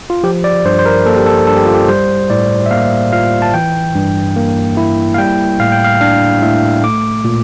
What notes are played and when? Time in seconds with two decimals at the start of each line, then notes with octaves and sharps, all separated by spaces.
0.10 F4
0.24 F3 G4
0.44 D5
0.65 G2 C5
0.79 C5
0.86 A#4
1.06 A#3 A4
1.16 G4
1.26 A4
1.47 G2 A4
1.56 G4
1.65 F4
1.74 G4
1.88 G3 C5
2.30 A2 D5
2.66 E5
2.71 A#3 F5
3.13 F4 F5
3.42 A5
3.54 E3 G5
3.95 G2
4.36 A#3
4.77 E4
5.14 F5
5.18 G3 G5
5.60 A2 F5
5.72 G5
5.84 F5
6.01 D4 F5
6.42 A2 E5
6.83 A3 D6
7.25 A#2